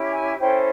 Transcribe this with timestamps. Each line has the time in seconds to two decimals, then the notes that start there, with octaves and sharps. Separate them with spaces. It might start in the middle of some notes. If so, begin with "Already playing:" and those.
Already playing: C#4 E4 G4
0.13 G#5
0.39 C#4 E4 A4 C5 G5